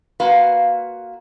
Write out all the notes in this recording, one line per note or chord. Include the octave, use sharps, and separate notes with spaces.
A#3 F4 F#4 B4 F5